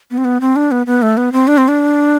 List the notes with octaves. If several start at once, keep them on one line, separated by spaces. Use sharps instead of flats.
B3
C4
B3
C4
D4
B3
B3
A3
B3
C4
D4
C4
D4